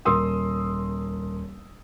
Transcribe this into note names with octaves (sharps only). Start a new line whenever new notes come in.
D#1 A#4 C6 D#6 E6